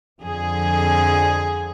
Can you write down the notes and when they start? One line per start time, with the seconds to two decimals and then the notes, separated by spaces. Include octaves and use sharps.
0.21 F2 D3 F3 G#4